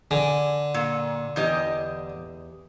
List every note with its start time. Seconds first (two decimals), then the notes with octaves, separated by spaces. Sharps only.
0.11 D3 G#5
0.74 A#2
1.36 E2 G4 D#5